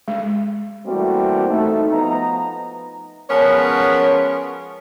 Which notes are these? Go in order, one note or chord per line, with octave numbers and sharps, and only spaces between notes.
G#3
E3 G3 A3 A#3 C4 F#4
A3 D#4
F3 B3 D#4 A#5
F3 G#3 B3 C#4 A#4 C#5